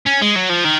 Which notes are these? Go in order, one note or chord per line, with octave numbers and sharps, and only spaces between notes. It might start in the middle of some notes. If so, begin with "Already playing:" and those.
C#4
G#3
F#3
F3
D#3